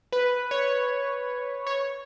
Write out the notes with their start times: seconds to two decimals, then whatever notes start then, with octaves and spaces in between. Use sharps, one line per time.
0.12 B4
0.51 C#5
1.67 C#5